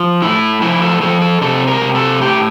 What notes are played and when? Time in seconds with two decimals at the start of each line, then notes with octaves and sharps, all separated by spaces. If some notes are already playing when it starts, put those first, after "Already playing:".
Already playing: F3
0.22 A2 E4
0.62 F3 E4
0.82 A4
1.01 F3 A4
1.21 A4
1.41 C3 A4
1.67 A#4
1.81 C3
1.95 A4
2.20 A2 G4